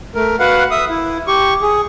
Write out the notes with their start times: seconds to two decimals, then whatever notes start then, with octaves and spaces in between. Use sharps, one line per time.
0.15 A3 A#4
0.40 F#4 B4 F5 F#5
0.71 E5 D#6
0.89 E4
1.27 G4 C#6
1.62 G#4